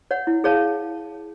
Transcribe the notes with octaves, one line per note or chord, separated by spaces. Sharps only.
C#5 F#5
E4
G#4 C#5 F5 A5